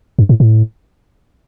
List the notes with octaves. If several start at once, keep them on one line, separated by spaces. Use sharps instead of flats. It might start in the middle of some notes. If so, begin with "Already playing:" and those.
G2
A2
A2